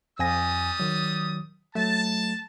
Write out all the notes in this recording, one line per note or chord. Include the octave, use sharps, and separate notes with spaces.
F2 G3 G#5 D#6 A#6
D#3 F#3
F#3 A3 A5